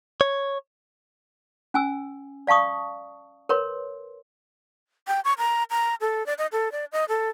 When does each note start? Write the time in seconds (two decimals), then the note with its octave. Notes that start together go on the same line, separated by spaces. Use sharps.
0.21 C#5
1.74 C#4 G#5 E6
2.47 D5 F5 A5 C#6 D#6
3.49 A#4 B4 C#5 C6
5.07 G5
5.25 C#6
5.38 A#5
5.71 A#5
6.01 A4
6.26 D5
6.38 D#5
6.52 A4
6.72 D5
6.92 D#5
7.09 A4